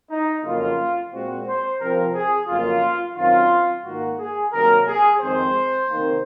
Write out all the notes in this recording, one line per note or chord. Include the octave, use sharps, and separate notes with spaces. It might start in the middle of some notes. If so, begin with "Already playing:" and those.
D#4
F2 C#3 F#3 A#3 F4
A#2 G#3 C4 F#4
C5
C3 F3 C4 A#4
G#4
F2 C#3 F#3 A#3 F4
F#2 D#3 F#3 C4 F4
G#2 D#3 A#3 F#4
G#4
C3 D#3 F#3 A#3 A#4
G#4
F2 D#3 G#3 C4 C5
C3 D#3 A#3